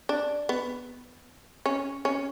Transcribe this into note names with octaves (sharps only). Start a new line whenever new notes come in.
D4
B3
C#4
C#4